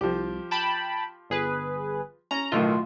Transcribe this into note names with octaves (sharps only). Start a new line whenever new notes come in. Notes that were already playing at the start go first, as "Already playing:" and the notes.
C2 F3 G4
G5 A5 B5
G1 G#4 B4
C#4 A#5
B1 A2 D#3 F4